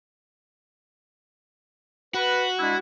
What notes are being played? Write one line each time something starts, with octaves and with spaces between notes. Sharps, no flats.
F#4 B4
G#3 D4 E4